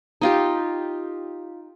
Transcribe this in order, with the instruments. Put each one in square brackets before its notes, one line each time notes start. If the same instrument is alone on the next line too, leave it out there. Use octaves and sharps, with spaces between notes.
[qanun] D#4 F4 G4